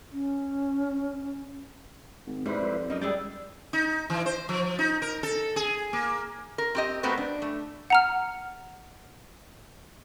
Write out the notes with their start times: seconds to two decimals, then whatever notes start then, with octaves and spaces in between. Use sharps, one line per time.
0.11 C#4
2.27 G#1
2.46 G#2 G3 E4 B4 C5
2.60 F2
2.90 F#2 A#3 D#4 D#5
3.01 E3 G3 G#3 G#4 D5 G5
3.73 D#4
4.10 E3
4.26 C5
4.49 F3
4.79 D#4
5.02 A#4
5.23 A4
5.56 G#4
5.93 A#3
6.58 A#4
6.75 C4 G4 D#5
7.03 A3 B3 C4 F#4 A#4 B4
7.18 D4
7.42 A3
7.90 F#5 A#5 F6